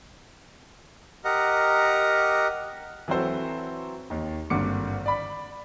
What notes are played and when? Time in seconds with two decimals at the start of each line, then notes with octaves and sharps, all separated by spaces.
1.25 G4 A#4 D#5 F#5 A#5
3.08 E3 F#3 C4 A4 C5
4.10 D#2 D#3
4.50 G#1 G2 D3 A#3 D6 C#7
5.06 D5 B5